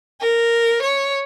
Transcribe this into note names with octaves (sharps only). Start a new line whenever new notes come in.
A#4
C#5